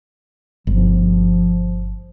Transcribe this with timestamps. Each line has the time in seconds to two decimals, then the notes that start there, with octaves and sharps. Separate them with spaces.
0.67 G1 F3